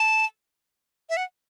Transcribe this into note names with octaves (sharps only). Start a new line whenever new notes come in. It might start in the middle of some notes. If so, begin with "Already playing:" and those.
Already playing: A5
E5
F#5